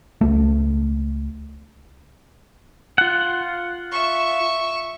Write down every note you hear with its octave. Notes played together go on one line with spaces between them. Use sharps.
C#2 A3
F4 F#5
E5 C#6